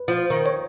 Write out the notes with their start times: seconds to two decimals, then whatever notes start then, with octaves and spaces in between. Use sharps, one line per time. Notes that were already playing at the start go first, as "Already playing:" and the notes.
Already playing: B4
0.08 F3
0.30 D#3
0.46 C#5